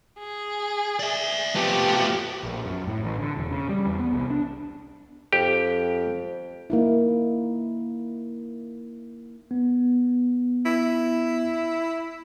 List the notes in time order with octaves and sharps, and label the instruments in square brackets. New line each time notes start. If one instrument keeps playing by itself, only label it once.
[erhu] G#4
[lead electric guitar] D5 E5
[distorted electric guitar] F3 A3 [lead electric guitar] B3 B4 [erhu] G4
[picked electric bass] A#1
F#2
A2
A1
D3
E1
C#3
G3
E2
B3
C2
D4
[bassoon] F2 [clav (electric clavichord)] G4
[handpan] A#3 D#4 E4
[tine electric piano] B3
[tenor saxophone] E4